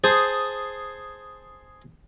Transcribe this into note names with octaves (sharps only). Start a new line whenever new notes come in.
G#4 C5 A5 D#6